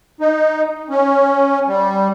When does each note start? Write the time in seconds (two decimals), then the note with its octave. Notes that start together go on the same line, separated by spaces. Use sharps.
0.20 D#4
0.90 C#4
1.67 G3